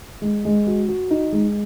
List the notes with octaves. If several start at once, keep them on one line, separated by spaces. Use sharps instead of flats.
G#3
G#3
F#4
F#4
D#4
G#3